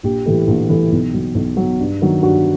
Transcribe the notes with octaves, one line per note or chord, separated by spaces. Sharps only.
A#1 G4
A2 E3 G3
A#1
A2 E3 G3
B1
B2 F#3
B1
B2 F#3
G2
D#3 F#3
G2 F#4